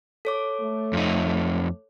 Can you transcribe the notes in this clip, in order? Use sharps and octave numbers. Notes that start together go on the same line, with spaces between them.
A4 C#5 D6
A3
F2 D#4